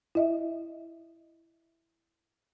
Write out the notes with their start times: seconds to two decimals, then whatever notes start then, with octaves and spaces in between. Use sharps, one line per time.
0.15 E4 D#5 E5